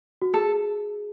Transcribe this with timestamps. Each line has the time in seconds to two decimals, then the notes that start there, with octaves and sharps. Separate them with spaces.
0.22 F#4
0.34 G#4 A4